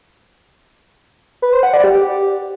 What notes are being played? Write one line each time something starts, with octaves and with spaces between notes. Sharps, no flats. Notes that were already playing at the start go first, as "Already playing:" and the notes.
B4
C5
F#5
D5
G4